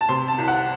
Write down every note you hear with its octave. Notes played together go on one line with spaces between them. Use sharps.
A5
C3 C6
A5
C2
F#5